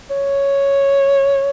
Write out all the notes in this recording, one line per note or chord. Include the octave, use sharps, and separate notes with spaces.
C#5